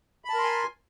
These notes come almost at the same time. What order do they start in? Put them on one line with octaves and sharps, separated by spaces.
B5 A5 A#4 C6 G#5